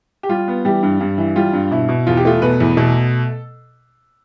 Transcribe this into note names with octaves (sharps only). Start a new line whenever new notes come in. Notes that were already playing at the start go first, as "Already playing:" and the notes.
G4
G3 F4
B3
E3 G3 G4
G2
G2
E3
G3 F4
G2
B2 E4
B2
E2 F4
G4
A3 F4
B2 B3 B4
E2
B2 A3 A4